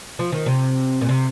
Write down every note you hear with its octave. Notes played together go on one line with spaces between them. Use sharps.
F3
D#3
C3
A#2
C3